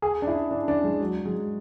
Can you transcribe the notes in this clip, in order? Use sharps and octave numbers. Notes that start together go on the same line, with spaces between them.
G#4
D4
E4
D4
D4
G#3
F#3
G#3